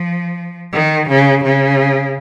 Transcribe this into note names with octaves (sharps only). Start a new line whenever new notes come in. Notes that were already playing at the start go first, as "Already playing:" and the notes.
Already playing: F3
D#3
C#3
C#3